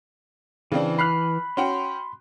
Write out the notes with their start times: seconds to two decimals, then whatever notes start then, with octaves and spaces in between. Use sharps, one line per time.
0.72 C#3 E3 C4 D4
0.98 B5 F6 F#6 C7
1.57 C#4 F#4 G5 C6